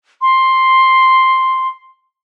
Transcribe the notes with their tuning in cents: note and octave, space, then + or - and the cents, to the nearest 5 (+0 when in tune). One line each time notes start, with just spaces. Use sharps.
C6 +5